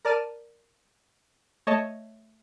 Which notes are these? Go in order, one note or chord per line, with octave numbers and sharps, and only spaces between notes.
A#4 D5 A5 F6 D#7
A3 C#5 D#5 A5